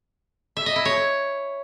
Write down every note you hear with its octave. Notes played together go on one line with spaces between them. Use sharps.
E5
D#5
E4
C#5